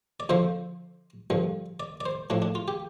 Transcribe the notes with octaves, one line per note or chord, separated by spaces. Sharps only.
D5
F2 D3 F3 C5
G2 D3 F3
D5
D5
C5
A2 F3 D4
D4
F4
G4